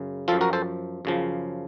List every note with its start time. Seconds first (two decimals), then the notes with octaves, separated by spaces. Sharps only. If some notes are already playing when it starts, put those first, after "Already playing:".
Already playing: F#2 C#3
0.28 F#2 F3 F4 A4
0.41 F#4 A#4
0.53 A4 C5
1.05 F#2 C#3 F3